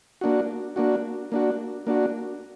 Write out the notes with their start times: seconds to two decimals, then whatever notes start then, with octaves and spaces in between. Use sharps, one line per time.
0.21 A#3 D4 F#4
0.76 A#3 D4 F#4
1.32 A#3 D4 F#4
1.87 A#3 D4 F#4